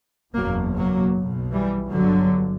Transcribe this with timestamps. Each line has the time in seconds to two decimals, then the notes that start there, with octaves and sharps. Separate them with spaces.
0.35 F#1 E2 B2 F#3 A#3
0.75 F#3 A#3
1.14 B1 B2
1.52 E3 G3
1.91 G1 G2 D3 F#3